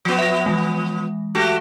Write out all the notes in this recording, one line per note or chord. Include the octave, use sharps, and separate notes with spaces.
F3 B3
E5 A#6
E3 G#3
A3 F#4 G4